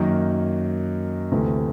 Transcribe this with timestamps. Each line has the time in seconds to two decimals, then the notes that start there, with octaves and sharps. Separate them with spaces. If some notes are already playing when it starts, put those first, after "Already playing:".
Already playing: F#2 D#3 F#3 A#3 D#4
1.32 D2 C3 E3 A3